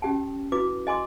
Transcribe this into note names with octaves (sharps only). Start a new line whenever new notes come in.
C#4 G4 G5 A5
E4 F#4 B4 D6
D#5 G#5 C6 D6